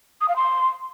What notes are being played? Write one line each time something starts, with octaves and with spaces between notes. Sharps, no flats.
D#6
F5
C6